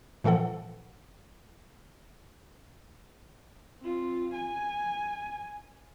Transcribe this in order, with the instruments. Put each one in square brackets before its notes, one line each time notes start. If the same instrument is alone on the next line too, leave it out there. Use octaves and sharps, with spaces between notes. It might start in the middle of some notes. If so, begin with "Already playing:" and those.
[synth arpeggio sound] A#2 E3 F3 A4 F#5
[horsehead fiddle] C4 F4
G#5